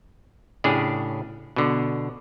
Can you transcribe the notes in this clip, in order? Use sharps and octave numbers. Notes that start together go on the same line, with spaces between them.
A2 C#3 D4 G4 G#4
B2 D3